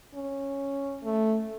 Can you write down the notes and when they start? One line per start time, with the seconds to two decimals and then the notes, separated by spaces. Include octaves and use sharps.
0.14 C#4
1.03 A3